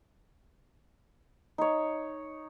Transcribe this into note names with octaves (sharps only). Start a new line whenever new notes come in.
D#4 C#5